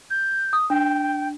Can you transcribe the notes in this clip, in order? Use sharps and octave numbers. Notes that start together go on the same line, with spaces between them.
G6
D#6
D4 G5